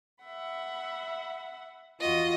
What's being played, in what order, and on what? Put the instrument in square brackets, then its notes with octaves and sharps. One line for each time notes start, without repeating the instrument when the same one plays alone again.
[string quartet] E5 F#5 B5
[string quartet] E2 F#4 [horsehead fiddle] F4 [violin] D#5